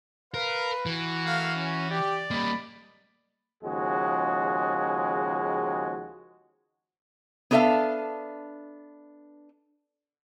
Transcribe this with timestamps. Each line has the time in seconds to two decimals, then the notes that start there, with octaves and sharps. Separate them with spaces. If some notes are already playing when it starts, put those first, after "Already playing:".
0.34 A#4 B4 F5
0.86 E3 F#4
1.25 A3 A#4 F5
1.56 C#4
1.91 G4 D5
2.31 G3 A#3 D#5 B5
3.64 D#2 C#3 F3 G#3 F#4 G#4
7.51 B3 D4 A4 D5 E5 F5